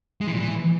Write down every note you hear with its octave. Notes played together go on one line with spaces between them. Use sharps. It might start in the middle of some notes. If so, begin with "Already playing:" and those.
G#3
E3
A#2
E3